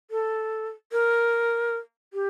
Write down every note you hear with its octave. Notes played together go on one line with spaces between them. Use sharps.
A4
A#4
G4